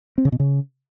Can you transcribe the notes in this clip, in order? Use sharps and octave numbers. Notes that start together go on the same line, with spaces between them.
C4
C#3
B2
C#3